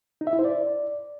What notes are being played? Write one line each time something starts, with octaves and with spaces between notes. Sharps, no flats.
D#4
E5
E4
C5
D5